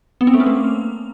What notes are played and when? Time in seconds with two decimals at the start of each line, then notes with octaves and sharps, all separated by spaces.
0.21 B3
0.27 C4
0.34 A3
0.40 C#4
0.46 A#3